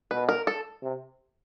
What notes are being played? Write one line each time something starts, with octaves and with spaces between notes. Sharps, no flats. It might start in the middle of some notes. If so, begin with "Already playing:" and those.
B2 B4
A#4
A4
C3